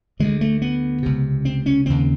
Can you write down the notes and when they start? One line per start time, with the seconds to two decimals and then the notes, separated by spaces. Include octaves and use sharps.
0.20 D2 D3 G#3
0.41 A3
0.62 B3
1.03 C#2 C3
1.45 C4
1.66 C#4
1.86 D#2 C#3 C4